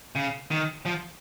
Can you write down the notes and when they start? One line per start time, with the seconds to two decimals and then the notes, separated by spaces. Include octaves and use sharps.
0.16 C#3
0.51 D#3
0.85 F3